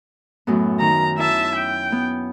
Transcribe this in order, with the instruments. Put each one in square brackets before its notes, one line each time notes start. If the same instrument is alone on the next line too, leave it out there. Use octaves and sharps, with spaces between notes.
[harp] F#2 A2 B3
[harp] D#3 [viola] A#5
[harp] E4 [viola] E5 A5
[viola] G5
[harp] B3